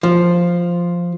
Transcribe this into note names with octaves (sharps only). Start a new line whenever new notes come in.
F3